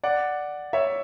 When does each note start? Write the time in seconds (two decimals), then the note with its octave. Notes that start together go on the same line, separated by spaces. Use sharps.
0.03 D5 F#5
0.73 C#5 E5